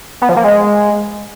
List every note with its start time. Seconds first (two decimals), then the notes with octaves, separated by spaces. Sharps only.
0.22 B3
0.29 F3
0.37 A#3
0.44 G#3